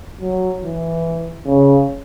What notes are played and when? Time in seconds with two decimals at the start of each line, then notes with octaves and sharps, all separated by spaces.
0.21 F#3
0.64 E3
1.46 C#3